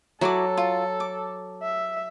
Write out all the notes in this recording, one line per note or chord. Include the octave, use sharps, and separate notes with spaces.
F#3 E4 F#4 A4 D6
F4
D6
E5